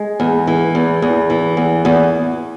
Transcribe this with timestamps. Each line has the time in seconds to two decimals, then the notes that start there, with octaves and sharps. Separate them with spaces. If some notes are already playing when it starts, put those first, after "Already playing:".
Already playing: G#3
0.20 E2
0.47 E3
0.75 E2
1.02 E2
1.30 E3
1.57 E2
1.85 E2